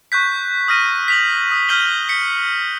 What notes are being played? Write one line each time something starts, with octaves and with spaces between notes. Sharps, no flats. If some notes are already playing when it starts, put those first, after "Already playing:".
C#6 F#6 G6 B6
D#6 F6 A#6 D#7
B6 F7 F#7
D#6
F6 G6 B6 D#7 F#7 G7
B6 C#7